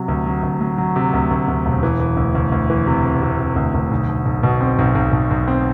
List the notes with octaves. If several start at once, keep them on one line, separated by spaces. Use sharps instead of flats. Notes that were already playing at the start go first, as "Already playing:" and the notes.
Already playing: C3 F#3
D2
F#3
D2
F#3
F#3
C3
D2
D2
D2
E1
E3
E3
D2
D2
D2
E3
C3
C3
C3
C3
D2
D2
B1
B1
B1
B2
C4
B1
B1
B1
B1
C4